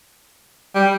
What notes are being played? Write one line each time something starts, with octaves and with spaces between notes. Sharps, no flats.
G3